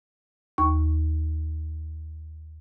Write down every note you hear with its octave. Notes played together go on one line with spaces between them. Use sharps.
D#2 C#6